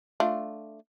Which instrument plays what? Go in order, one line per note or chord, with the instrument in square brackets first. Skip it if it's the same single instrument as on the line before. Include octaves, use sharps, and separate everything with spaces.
[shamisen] A3 D4 F4